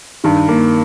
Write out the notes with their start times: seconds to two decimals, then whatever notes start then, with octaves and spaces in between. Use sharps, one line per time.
0.24 G2 D#3
0.49 A#3